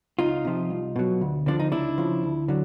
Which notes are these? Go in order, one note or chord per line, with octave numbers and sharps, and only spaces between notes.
C#2 D#4 F4
C3 F3
C2
B2 F#3
D2
D3 F3 D4
D#4
C#2 D4 E4
C#3 F3
D2
D3 F#3